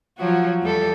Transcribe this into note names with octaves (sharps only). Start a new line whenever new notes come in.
F3 F#3 F#4
E2 G3 A4